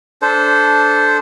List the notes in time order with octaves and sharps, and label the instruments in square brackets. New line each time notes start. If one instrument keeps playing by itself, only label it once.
[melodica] D4 A4 C5